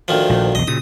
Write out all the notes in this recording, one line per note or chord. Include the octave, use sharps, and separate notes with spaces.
D2 D#3 F3
A#1
B1 E2 D#5
A#2 C#3 D#6